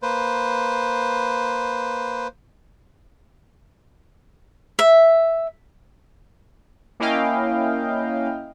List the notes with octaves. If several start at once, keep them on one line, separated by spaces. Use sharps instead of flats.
A#3 B4 C5
E5
A#3 C#4 E4 D#5 F5 G5